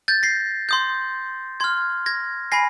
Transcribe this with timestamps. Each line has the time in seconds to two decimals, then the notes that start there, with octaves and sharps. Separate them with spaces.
0.08 G6 A6
0.23 A#6 C7
0.69 C6 D#6 G6
1.60 C6 F6 G#6
2.06 G#6 A#6
2.52 G#5 B5 A#6 C7